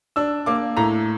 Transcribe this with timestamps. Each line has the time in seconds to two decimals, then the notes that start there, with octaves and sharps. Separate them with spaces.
0.16 D4 E6
0.46 A#3 D6
0.77 A2 A#5